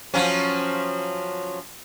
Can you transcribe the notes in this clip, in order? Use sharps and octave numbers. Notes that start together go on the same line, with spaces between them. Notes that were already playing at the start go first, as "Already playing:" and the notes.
F3 F#3 C#4